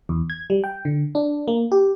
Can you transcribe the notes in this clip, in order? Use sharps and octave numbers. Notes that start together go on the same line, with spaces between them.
E2
G#6
G3
G5
D3
D4
A#3
G4